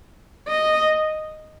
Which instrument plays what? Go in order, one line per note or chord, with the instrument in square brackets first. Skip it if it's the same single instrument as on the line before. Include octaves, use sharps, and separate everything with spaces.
[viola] D#5